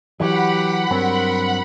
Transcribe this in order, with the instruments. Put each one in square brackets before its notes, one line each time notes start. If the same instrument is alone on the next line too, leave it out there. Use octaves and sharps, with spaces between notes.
[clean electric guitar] E3 F#3 [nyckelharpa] G4 [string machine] F#5 B5
[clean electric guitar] G2 F#3 C4 [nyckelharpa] A#4